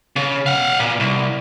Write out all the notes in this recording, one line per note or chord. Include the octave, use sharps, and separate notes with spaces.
C#3
F5 F#5
A#2
C2